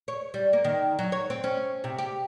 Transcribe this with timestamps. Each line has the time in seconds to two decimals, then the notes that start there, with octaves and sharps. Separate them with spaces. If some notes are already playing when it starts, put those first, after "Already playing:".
0.08 C#5
0.34 G3
0.53 A#3
0.65 D#3
0.99 F#3
1.12 C#5
1.30 C4
1.44 C#4
1.84 C3
1.98 G4